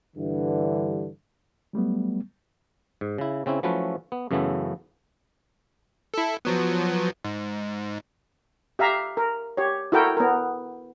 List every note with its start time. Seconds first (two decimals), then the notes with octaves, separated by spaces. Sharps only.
0.17 G2 D3 E3
1.73 F#3 G3 A3 B3
3.01 G#2
3.18 C#3 E4
3.46 C#3 C4 C#4 E4
3.63 F3 F#3 A3 C#4 E4 B4
4.12 B3
4.31 F#2 C#3 E3 A3 B3 E4
6.14 E4 A4
6.45 F3 F#3 B3
7.24 G#2
8.79 G4 E5 F5 A#5
9.17 A#4
9.57 G4 C#5
9.92 E4 F#4 A4 A#4 G5
10.17 B3 A#4